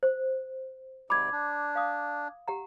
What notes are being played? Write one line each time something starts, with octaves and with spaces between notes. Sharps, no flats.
C5
G#2 C3 D5 B5 D6 G#6
D4
F5 D#6
G4 F#5 A#5